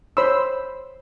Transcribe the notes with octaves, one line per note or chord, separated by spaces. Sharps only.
C5 C#5 B5 C6 E6